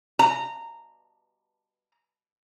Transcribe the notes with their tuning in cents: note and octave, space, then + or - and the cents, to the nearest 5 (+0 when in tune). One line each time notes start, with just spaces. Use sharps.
A#5 -15